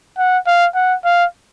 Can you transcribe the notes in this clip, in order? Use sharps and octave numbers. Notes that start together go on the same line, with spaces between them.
F#5
F5
F#5
F5